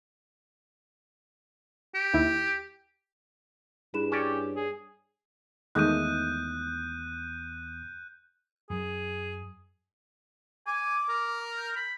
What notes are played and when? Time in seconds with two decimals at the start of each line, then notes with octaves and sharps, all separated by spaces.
1.95 G4
2.14 D#2 E4
3.94 G2 E4 G#4 B4 E7
4.12 C#4 G4 C#5 D5
4.56 G#4
5.75 E2 D#3 G#3 A3 D#6 F#6 G6 D#7
8.70 F#2 F#3 G#4
10.67 G#5 D6
11.09 A#4
11.57 G6
11.76 B5